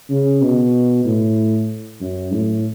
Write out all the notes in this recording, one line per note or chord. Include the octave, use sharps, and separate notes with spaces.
C#3
B2
A2
F#2
A2